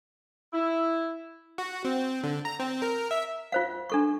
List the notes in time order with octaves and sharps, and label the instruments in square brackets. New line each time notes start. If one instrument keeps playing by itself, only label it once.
[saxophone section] E4
[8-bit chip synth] F#4
C4
D3
A#5
C4
A#4
E5
[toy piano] F4 C5 F5
D4 A4 C#6